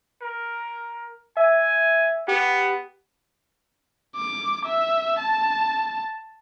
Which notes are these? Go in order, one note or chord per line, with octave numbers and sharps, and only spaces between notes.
A#4
E5 G#5
B3 G4
D6
E5
A5